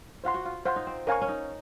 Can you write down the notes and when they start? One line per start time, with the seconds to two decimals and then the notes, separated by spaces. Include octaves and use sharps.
0.24 F4 C5 F#5 C6
0.34 F#4
0.45 F4
0.66 F4 C5 F#5 C6
0.76 D#4
0.87 C4
1.07 C#4 A#4 F5 G#5 C#6
1.21 C#4
1.28 D#4